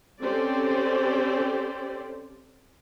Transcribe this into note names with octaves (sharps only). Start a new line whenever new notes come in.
C4 C#4 G4 A4 C5 D5